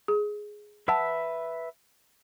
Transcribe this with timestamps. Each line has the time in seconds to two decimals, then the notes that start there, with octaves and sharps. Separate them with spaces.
0.08 G#4
0.88 B4 E5 F#5 A5 E6